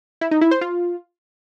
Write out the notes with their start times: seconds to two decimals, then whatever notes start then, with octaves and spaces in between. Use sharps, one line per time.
0.21 E4
0.31 D#4
0.41 E4
0.51 C5
0.61 F4